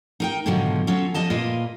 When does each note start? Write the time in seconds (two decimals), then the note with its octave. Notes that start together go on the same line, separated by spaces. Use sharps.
0.20 D#4 A#4 G5
0.46 G#2 B2 D3 D#3 F3 F#3
0.87 F#3 C#4 F4 A4
1.14 F3 G3 D#5 A5
1.30 A#2 A#3 F4 B4 D#5